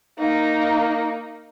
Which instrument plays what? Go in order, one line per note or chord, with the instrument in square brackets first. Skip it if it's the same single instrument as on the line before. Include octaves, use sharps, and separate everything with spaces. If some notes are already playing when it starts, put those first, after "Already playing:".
[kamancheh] A#3 D#4